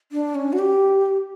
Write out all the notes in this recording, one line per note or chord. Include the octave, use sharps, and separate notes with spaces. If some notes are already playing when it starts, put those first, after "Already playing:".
D4
C#4
F#4
G4